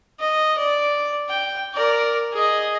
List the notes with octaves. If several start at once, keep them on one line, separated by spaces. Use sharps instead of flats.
D#5
D5
G5
A#4 D5
G#4 D#5